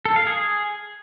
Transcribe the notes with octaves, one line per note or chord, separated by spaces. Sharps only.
A4
F5
G#4